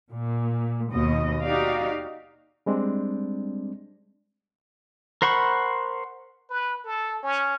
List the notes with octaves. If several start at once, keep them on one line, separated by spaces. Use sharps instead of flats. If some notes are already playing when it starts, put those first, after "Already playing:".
A#2
D#2 B2 D#5
D#4 F#4 G4 D5 F5
G3 G#3 C4 D4
A#4 C5 F#5 B5 C#6
B4
A4
C#4